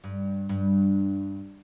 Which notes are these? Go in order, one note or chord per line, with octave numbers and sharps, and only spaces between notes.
G2
G2